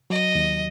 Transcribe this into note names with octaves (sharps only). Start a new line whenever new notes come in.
F#3 D#5
D#2